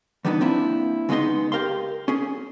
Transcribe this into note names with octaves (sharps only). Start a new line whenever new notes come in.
E3 G3 B3 D4 D#4
A#3 C4 D4 E4
C#3 G#3 B3 D#4 D#5 C6
G4 A#4 F5 C6
C#4 G#4